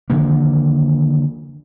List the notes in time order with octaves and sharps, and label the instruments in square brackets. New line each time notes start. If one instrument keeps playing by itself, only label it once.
[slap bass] D3 D#3 F3 A#3